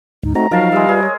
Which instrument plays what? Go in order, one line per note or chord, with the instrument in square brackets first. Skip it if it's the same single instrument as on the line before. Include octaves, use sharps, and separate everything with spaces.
[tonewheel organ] D2 G#2 [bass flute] D#4
[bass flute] A3 [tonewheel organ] C4 D#4 F#4 [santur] A#5
[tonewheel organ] F3 D#4 [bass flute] F#3 [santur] A#4 A5 [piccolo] F5
[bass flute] G3 [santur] G#3 E5
[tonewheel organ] F4 B4 D5 [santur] G#4
[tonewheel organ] C#5